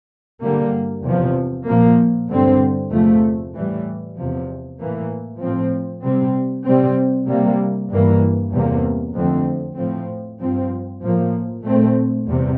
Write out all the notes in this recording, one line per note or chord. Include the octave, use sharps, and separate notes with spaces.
G2 D3 G3 A#3
E2 C3 F3
A#2 F3 A#3
G2 D3 G3 C4
E2 C3 F3 A3
A2 E3 G3
E2 C3 F3
A2 E3 A#3
A2 F3 C4
C3 G3 C4
C3 G3 C4
C3 G3 A#3
G2 E3 A#3
E2 C3 G3 A#3
F2 D3 A3 C4
A2 F3 C4
G2 F3 C4
A2 F3 A#3
A#2 A3 C4
E2 C3 G3